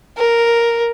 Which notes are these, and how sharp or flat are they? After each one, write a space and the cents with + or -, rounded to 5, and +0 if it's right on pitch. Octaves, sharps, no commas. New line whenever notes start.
A#4 +0